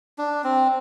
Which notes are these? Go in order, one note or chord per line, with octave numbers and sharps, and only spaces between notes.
D4
C4